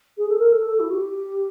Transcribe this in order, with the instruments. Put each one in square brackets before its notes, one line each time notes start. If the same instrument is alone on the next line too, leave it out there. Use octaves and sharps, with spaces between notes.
[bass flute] G#4
A4
A#4
A4
A4
E4
F#4
G4